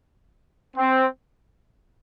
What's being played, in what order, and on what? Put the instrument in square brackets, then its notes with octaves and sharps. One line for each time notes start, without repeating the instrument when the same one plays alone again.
[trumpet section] C4